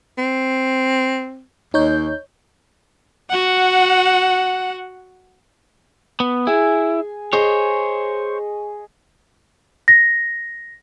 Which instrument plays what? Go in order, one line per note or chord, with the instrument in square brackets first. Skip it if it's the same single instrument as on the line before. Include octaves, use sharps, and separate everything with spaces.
[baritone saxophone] C4
[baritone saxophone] D#2 [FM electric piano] D#4 C#5 G6
[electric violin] F#4 F#5
[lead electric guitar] B3
[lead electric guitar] E4 [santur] G#4 G#5
[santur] G#4 D#5 C#6 [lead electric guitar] C5 C#5
[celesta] A#6